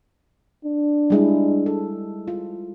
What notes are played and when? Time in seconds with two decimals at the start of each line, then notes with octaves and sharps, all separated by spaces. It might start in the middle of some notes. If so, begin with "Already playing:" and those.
0.65 D4
1.10 G3 G#3 E4
1.66 A4
2.28 F4